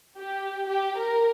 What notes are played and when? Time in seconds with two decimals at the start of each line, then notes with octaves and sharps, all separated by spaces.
0.19 G4
0.69 G4
0.98 A#4